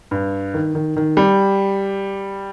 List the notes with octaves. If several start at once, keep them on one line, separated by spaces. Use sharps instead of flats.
G2
D#3
D#3
D#3
G3